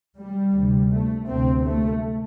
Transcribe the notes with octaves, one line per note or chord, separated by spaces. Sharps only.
G3
D2 C3
A3
D2 C3 C4
A3